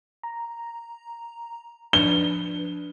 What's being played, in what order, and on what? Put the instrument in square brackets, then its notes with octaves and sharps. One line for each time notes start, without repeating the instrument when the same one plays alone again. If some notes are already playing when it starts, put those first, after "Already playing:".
[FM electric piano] A#5
[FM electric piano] F3 D4 B4 [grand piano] G7